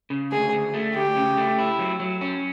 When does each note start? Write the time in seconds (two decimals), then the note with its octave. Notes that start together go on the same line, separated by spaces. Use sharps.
0.10 C#3
0.32 D2 G#4
0.52 D2
0.74 A3
0.95 D2 G4
1.16 C#3
1.37 A3
1.58 E4
1.79 F#3
2.00 F#3
2.21 C#4